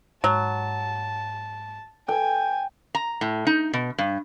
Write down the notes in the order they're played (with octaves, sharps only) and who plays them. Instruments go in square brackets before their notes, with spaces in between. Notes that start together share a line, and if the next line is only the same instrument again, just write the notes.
[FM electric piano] G#2 [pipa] F#3 [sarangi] A5
[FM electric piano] A4 [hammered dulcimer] G5 [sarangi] G#5
[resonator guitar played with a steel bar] A#5
A2
D#4
B2
G2